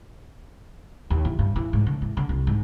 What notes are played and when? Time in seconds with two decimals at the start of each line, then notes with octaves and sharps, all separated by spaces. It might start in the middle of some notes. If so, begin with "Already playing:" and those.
1.10 D#2
1.25 E3
1.39 G2
1.56 E3
1.73 G#2
1.87 D3
2.02 E3
2.17 D3
2.29 C2
2.47 G#2